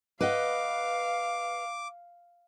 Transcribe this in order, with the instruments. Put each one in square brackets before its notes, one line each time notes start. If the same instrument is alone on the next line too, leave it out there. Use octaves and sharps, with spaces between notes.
[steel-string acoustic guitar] B4 D#5 F#5 [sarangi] F5 [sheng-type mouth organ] D6